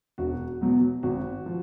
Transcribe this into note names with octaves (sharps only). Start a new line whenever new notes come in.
E1 F#4
E2 B2 F#3
G#1 F#4
F3